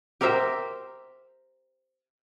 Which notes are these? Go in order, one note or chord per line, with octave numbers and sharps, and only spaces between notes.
G4 A#4 C5 E5 G5